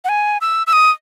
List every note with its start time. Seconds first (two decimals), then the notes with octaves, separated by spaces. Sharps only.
0.05 F#5
0.09 G#5
0.41 E6
0.67 E6
0.73 D#6